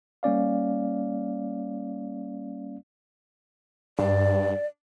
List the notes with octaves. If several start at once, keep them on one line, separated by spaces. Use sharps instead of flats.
G3 A#3 C#4 D5 F5
G2 D5